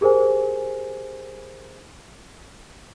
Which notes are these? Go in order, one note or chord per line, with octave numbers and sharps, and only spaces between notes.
G4 G#4 A#4 C5 G#5